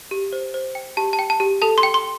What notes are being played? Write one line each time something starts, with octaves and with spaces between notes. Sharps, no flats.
G4
C5
C5
G5
G4 A5
A5
G5
A5
G4
A4 A5
C6
G5
C6